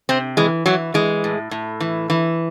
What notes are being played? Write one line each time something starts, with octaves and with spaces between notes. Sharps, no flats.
C3 C4
E3 G#3
E3 F#3
E3 G#3
A2
A2
E3
E3